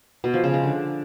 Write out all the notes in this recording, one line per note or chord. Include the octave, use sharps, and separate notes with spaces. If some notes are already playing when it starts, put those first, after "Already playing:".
B2
F3
C#3
G#3
D3